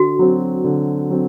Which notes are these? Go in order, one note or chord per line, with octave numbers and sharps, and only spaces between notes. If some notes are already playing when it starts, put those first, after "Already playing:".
Already playing: D3 F#4
F#3 C4
D3
F#3 C4